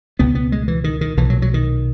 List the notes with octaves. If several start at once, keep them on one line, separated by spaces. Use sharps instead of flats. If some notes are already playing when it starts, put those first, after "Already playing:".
C#2 B2 B3
B3
G#3
E3
D#3
D#3
B1 A#2 E3
F#3
F#3
D#3